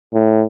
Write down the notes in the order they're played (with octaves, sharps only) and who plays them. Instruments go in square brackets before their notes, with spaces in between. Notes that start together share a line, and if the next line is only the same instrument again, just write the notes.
[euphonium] A2